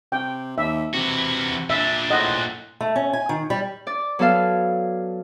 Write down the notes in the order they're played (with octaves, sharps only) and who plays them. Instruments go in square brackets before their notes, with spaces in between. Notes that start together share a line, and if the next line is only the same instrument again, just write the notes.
[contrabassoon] C3 [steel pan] G5
[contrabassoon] D#2 [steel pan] E5
[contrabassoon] C3 [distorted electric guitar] E3 F#4
[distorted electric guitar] A#2 D4 [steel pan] E5
[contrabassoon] A2 [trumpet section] C4 F#5 [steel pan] D#5
[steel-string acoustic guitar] A3
C#4
G#5
D#3
G3
[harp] D5
F#3 B3 A4 F5 F6